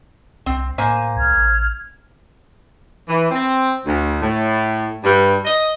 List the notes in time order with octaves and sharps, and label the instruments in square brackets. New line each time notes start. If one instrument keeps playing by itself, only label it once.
[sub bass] C2 [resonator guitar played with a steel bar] C4
[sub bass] A2 [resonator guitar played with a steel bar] A#3 C5 G#5
[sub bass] C2 [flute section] F6 G#6
[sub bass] A1
[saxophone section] E3
C4
D2
A2
G2
D#5